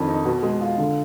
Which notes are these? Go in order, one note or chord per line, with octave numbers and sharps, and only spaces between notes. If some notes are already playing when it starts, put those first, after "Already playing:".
Already playing: F2 D#3 D4
D#4
B2
G#3
F4
D3